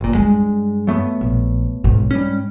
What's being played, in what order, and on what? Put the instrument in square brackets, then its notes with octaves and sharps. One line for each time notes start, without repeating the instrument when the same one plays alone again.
[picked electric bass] G1 A#2
[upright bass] G2 [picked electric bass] G#3
[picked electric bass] F#3 A3 B3
[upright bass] A#1
[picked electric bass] B1 [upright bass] G#2
[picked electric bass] G3 C#4